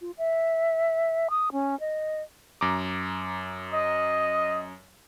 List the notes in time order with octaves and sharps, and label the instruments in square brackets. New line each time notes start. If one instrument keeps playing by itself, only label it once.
[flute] F4
E5
D#6
C#4
D#5
[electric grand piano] F#2 A#5 D6
[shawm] D#5